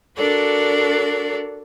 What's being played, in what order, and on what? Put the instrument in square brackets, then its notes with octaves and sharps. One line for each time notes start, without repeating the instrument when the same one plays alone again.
[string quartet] D4 F#4 A4 A#4 D5